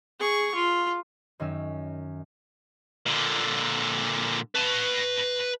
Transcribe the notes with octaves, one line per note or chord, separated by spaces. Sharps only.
G#4 C#6
F4
F#2 D#3 F#3 C#4 E6
A#2 D3
B4 A5